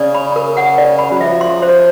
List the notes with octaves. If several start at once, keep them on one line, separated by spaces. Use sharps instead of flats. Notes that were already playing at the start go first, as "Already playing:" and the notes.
Already playing: C#3 D5
B5
A#4
F#5
D5
B5
F#3
F3 E5
C6
C5